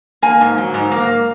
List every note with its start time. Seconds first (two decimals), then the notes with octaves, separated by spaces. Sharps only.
0.22 A#3 G#5
0.41 G#2
0.58 F#3
0.74 G#2
0.91 A#3